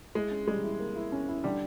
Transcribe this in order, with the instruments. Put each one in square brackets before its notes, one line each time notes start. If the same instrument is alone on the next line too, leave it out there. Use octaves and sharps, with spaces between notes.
[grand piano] G#3 [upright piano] E4
[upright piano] C#4
[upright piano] G3 [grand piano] G#3
[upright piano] E4
A#3
E4
C#4
E4
[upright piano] D3 [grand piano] G3